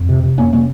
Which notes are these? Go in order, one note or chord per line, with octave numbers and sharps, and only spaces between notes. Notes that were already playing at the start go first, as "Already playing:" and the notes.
Already playing: F2
C3
C3
F2 A#3 C#4
C3 A#3 C#4